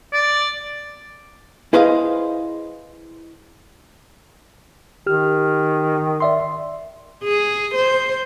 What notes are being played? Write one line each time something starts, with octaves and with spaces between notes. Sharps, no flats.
D5
E4 G#4 B4 C5 D#5 F5
D#3 G4 F6
D5 E5 C6
G#4
C5